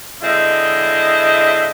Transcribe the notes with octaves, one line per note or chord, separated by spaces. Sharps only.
D3 G#3 C4 E4 D#5